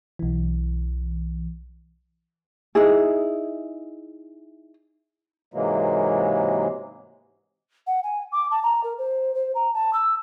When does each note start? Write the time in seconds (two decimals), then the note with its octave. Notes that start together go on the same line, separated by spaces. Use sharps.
0.19 B1 E3
2.75 D#4 E4 G#4
5.54 G#2 C3 E3 F#3 G#3 A#3
7.87 F#5
8.03 G#5
8.32 D6
8.51 A5
8.63 A#5
8.84 A#4
8.98 C5
9.34 C5
9.55 A#5
9.74 A5
9.93 E6